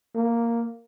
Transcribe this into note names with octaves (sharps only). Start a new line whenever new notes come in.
A#3